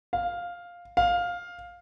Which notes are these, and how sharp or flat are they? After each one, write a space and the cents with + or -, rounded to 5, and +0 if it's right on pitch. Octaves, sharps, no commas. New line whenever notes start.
F5 +5
F5 +10